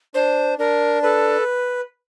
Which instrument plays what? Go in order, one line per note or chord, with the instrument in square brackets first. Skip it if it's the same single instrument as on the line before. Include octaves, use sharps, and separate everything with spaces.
[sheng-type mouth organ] D4 [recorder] C5
[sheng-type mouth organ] D4 [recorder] A#4
[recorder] A4 [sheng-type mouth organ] B4